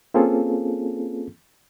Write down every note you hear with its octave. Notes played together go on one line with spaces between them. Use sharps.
A#3 C4 C#4 F4 G#4 A4